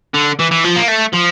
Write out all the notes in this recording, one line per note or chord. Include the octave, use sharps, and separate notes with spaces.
D3
E3
E3
F3
A#3
A3
F3